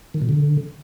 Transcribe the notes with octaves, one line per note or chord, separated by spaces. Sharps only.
D#3
B2
D3